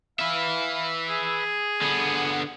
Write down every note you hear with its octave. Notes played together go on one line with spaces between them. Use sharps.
B4 E5 F5
G#4
D3 B3